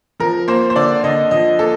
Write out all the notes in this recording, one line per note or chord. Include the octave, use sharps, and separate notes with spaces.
F3 A#4
A#3 C5
C5
D3 D5
D3 D#5
F3 D#5
A#3 A4